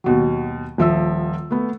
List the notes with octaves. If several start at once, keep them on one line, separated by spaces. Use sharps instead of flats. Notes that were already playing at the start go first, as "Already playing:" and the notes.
D#2 B2 F#3
D#1 F3 E5 E6
A3 B3